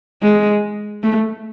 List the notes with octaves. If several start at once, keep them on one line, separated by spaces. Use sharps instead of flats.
G#3
A3